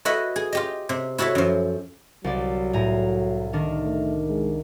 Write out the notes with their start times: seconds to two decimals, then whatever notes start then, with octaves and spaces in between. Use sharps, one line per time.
0.05 E4 F#4 B4 D#5 F#5
0.36 G#4
0.53 F4 G4 D#5
0.89 C3
1.18 E4 F#4 A4 C#5 E5
1.35 F#2 F3
2.24 C2 F#3 D5
2.73 A2 G#5 A#5
3.53 D#3 D4 A#4
3.83 A3
4.29 G#3